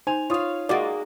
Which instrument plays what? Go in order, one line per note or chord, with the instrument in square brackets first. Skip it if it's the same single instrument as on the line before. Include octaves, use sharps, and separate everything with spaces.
[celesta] D#4 F7 [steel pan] C5 [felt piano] G#5
[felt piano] F4 D#6 [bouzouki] C#5 F5
[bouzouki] G#3 A#3 [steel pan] F#4 D5